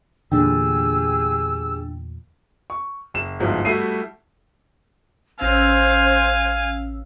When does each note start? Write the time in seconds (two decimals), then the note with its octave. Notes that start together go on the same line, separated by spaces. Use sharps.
0.32 E2 A#2 D3 D4 G4 G#4 G5 E6
2.70 C#6
3.14 F#1 E7
3.40 G1 D2 G#2 F3
3.65 G3 A3 E4 F#4 C7 D#7
5.40 A1 C#4 C5 F5 G#5 E6